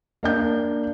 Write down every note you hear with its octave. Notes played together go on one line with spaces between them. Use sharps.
A#3 D4 G6